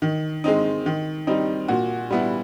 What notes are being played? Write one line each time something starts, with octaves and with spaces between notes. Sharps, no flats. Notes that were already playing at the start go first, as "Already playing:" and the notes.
D#3
G#3 C4 D#4
D#3
G3 C4 D#4
A#2 F#4
G3 B3 E4